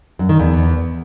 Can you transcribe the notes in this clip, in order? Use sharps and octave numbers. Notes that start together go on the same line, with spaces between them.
F#2
D#3
E2